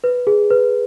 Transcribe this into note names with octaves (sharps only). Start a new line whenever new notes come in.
B4
G#4
B4